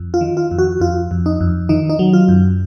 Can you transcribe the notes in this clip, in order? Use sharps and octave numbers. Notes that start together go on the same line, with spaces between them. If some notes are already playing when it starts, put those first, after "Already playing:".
Already playing: F2
F4
D#3
F4
F2
F#4
F2 F4
F2
D#4
F2
D#3 D#4
D#4
F#3
F4
F#2